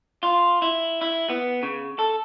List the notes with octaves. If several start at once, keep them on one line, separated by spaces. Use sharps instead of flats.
F4
E4
E4
B3
C#3
A4